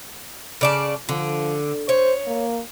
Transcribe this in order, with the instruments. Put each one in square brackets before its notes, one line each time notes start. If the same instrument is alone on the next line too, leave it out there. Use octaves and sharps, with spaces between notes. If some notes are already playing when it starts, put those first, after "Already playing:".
[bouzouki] C#3 D5 A5
[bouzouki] D3 [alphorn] F3
[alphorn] C5 [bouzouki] C#5
[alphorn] A#3